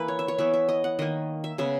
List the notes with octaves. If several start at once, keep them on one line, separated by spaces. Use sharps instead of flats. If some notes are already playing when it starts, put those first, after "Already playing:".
Already playing: E3 A#3 B4
C#5
E5
C#5
E3 B3 E5
E5
D#5
F#5
D#3 A#3 D#5
E5
C#3 G#3 B3 E5